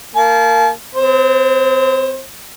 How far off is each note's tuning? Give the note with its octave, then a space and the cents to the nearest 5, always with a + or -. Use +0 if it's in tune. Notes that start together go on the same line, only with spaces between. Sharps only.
A#3 -20 A5 -40
C4 -35 C5 +30